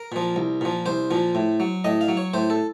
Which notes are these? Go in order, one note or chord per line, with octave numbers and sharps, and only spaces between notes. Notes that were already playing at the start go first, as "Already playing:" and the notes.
Already playing: A#4
A#2 F3
C2
A#2 F3
C2 C5
A#2 F3
A2
F#3
A2 D#5
F5
F#3
C#5
A2 C5
A4